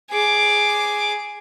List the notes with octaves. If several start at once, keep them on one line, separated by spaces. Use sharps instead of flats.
G#4 D6